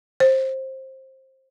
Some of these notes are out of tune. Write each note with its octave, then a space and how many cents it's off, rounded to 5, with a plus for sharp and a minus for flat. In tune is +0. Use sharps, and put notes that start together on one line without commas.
C5 +20